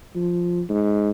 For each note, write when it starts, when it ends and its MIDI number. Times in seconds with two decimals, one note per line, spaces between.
0.15 0.62 53
0.69 1.10 44